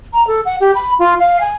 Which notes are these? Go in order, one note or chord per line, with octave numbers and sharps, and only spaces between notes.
A#5
A4
F#5
G4
B5
F4
F5
G#5